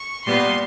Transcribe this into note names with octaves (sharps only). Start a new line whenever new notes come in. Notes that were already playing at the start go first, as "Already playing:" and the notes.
Already playing: C#6
A#2 G3 B3 C6